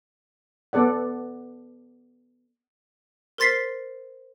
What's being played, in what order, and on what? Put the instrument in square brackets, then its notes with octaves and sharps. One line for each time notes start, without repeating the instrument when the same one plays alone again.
[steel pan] B3 A4 D5 F#5
[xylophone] A#4 C5 C6 A6 B6 C7